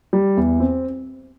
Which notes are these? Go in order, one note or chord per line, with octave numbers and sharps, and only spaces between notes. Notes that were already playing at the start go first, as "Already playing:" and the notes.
G3
E2
C4